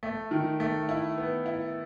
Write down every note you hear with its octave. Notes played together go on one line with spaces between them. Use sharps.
A3
D#3
A3
E4
B3
E4